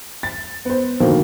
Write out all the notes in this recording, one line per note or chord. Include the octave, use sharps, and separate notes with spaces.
A6
B3 C5
B2 D3 D#3 F3 A#3